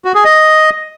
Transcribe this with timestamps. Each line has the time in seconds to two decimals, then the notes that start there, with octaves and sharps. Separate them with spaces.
0.05 F#4
0.15 G#4
0.25 D#5